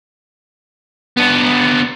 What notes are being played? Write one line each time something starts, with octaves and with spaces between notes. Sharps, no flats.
B3 D4